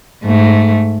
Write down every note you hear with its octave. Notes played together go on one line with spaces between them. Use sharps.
G#2 A3